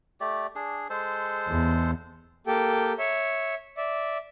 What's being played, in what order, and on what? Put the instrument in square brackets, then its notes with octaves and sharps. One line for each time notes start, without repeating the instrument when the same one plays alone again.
[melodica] A3 G4 D5
D4 G#4
G#3 A4 C5
[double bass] E2
[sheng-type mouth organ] A#3 G4 A4 G5
C#5 E5
D5 E5